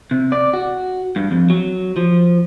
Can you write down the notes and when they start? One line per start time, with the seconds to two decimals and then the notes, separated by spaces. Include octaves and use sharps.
0.11 C3
0.32 D5
0.53 F#4
1.16 G2
1.31 F2
1.50 F#3
1.96 F3